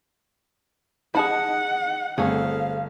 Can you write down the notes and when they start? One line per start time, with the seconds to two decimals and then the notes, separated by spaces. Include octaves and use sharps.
1.15 D#4 G#4 F#5 A5 B5
2.18 G1 A3 C4 G#4 F5